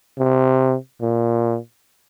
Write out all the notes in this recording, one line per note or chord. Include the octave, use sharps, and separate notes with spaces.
C3
A#2